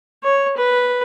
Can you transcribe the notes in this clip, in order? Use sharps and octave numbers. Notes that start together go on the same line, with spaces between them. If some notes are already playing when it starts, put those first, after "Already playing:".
C#5
B4